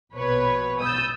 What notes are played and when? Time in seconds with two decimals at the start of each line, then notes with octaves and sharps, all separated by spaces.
0.14 A#1 B2 B4 C#5
0.80 D#6 E6 G6 A6